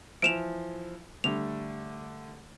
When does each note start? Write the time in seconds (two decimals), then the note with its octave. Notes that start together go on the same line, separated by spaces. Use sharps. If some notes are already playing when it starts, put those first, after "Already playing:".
0.22 E3 F3 D7 E7 F7
1.24 D3 G3 A3 F7